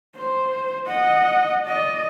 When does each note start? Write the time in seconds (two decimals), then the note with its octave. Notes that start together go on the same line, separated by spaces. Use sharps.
0.15 C5
0.87 D#5 F#5
1.67 D5 D#5